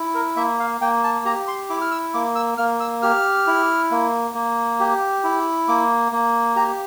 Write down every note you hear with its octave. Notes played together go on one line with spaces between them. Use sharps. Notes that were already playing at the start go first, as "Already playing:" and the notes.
Already playing: E4
A#4
A#3 E5
F5
A#3 G5
A5
G4 A#5
C6
E4 D6
F6
E6
A#3 D6
E6
A#3 F6
E6
G4 F6
E4
A#3
A#3
G4
E4
A#3 D6
A#3
G4 A#5